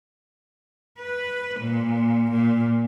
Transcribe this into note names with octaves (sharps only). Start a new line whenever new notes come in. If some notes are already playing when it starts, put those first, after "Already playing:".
B4
A#2
A#2